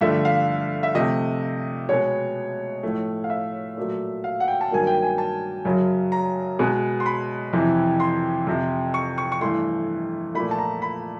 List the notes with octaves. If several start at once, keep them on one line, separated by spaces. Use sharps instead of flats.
G2 D3 F3 A3 E5
F5
E5
C3 F3 A3 D#5
B2 G#3 B3 C#5
A2 F3 A3
F5
E5
A#2 F#3 A3
F5
F#5
G5
A5
G2 D#3 F#3 A#3 G#5
G5
G#5
A5
F#2 C#3 F#3
A#5
B2 G#3 B3
C6
B5
F2 C3 E3
C6
F2 C3 F3
C#6
C#6
C#6
G2 E3 A3 C6
A#2 F3 A3 B5
A5
A#5
B5